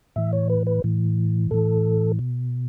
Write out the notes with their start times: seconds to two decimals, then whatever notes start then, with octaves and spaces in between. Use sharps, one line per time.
0.16 A2 E3 E5
0.33 C#5
0.50 B4
0.67 B4
0.84 A2 E3
1.51 A2 E3 A4
2.19 B2